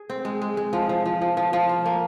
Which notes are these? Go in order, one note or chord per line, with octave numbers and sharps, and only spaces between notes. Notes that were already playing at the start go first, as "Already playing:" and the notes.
Already playing: G#4
C4
G#3
G#3
G#3
F3
F3
F3
F3
F3
F3
F4
A#3